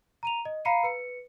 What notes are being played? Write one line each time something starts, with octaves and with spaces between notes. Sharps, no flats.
A#5 D#7 F7
D#5
F5 A#5 B5 C7 C#7 D#7
B4 C#7